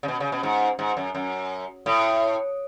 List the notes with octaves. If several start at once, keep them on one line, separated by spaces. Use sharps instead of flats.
C#3
B2
C#3
B2
G#2
G#2
F#2
F#2
A2